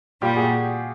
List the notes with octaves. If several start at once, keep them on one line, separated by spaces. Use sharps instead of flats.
A#2 G3 F4 G4
F#4 G#4